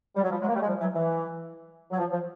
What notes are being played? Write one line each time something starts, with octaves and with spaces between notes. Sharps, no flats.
G3
F#3
F3 G3
F#3 G#3
A#3
G3 A3
G#3
F3 G3
E3 F#3
E3
F#3
F3
F3